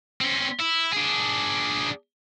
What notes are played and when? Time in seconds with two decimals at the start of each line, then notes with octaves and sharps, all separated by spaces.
0.21 C4 C#4
0.59 E4
0.93 D4 G#4